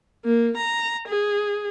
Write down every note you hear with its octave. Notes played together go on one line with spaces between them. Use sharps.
A#3
A#5
G#4